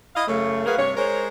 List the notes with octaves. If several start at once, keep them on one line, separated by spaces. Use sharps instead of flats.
E4 D#5 F5
F#2 C#3 A3
F#4 G#4 A#4 B4 F5
G2 C3 C#5
G#3 A#4 C5 C#5